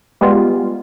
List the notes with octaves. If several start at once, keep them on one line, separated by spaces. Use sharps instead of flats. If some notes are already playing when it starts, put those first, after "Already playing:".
G3 G#3 B3 F4